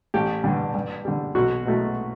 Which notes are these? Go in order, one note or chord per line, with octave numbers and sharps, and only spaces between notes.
A1 G4
G2 D3 G3
G2
D3 G3
B1 F#4
B2 F#3 A3